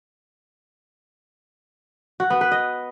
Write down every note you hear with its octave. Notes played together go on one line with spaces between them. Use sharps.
F#4
B3
B4
D#5